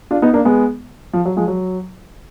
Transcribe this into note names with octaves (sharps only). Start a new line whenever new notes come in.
D4 F4
B3 D#4
A#3 D4
G#3 B3
F3
F#3
F3 G#3
F#3